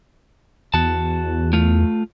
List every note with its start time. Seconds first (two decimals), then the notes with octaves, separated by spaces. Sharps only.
0.74 E2 F#4 A5
1.53 A3 F4